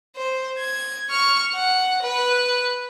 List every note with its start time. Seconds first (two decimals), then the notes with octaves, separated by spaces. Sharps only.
0.17 C5
0.58 G#6
1.10 C#6 F6
1.53 F#5
2.02 B4